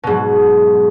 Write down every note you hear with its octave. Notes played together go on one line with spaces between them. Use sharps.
G#2 B2 F#3